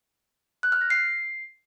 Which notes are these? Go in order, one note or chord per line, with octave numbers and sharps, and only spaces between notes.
F#6
F6
A#6
C7